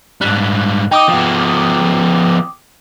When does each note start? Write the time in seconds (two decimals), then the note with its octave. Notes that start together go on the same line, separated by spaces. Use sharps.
0.21 G#2 G3 F#6
0.91 D#4 G5 D6 D#6
1.09 F3 B3